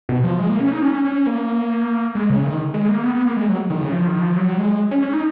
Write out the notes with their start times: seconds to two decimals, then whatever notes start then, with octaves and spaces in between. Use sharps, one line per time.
0.09 B2
0.24 F3
0.39 G#3
0.50 A#3
0.60 C#4
0.72 D#4
0.82 C#4
1.04 C#4
1.27 A#3
2.15 G#3
2.30 C#3
2.45 D#3
2.74 G#3
2.89 A#3
3.04 B3
3.14 B3
3.26 A#3
3.37 G#3
3.48 F#3
3.70 D#3
3.81 C#3
3.92 F3
4.07 D#3
4.21 F3
4.36 F#3
4.58 G#3
4.91 C#4
5.02 C#4
5.13 D#4